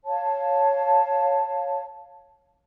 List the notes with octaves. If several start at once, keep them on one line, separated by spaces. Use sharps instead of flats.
C#5 F5 A5